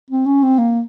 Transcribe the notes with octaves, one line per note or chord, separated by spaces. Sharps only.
C4
C#4
C4
A#3